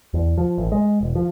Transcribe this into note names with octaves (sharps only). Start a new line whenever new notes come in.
E2
F3
A1
G#3
E1
F3